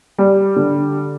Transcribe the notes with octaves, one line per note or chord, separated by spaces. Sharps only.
G3
D3